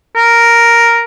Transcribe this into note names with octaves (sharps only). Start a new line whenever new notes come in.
A#4